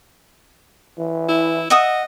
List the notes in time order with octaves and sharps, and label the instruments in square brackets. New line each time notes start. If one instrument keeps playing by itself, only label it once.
[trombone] E3
[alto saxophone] E4
[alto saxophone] D#5 [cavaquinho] E5 F#5 D#6